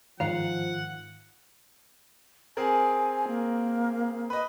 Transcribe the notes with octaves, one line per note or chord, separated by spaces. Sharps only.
G#2 D#3 F3 F4 F5 F#5 A#5
C4 G#4 A#4 G#5
A#3
B4 D#5